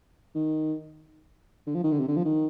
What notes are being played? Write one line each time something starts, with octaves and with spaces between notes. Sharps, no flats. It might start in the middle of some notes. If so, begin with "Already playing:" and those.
D#3
D3
F3
D#3
D3
C3
D3
F3
D#3